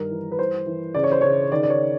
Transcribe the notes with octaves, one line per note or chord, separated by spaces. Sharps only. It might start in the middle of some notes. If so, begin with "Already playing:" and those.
Already playing: G2 D#3 A#4
E3
B4
E3 C5
E3
C#3 D5
C#5
C5
C#3 C#5
D#3 D5
D5
C#5